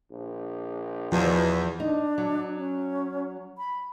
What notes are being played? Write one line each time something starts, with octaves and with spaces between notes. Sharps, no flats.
A#1
E2 B2 F3 F4
D4 D#4
F#3
C#4
B5